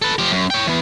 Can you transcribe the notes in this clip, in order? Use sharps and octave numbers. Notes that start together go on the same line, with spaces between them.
A4 B4
F3 G4
F#2
C#5 G5
E3 B3